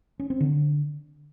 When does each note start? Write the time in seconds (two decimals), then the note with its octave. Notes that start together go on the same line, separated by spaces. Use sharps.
0.20 C#4
0.30 C4
0.41 D3